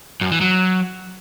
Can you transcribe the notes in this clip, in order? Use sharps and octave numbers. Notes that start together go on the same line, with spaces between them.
F#2
E3
F#3